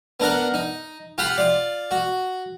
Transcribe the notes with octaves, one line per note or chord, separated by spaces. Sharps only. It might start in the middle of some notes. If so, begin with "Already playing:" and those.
B3 D4 A#4 F#5
D#4
F4 G4 F#5 B5 C6
F4 D5
F#4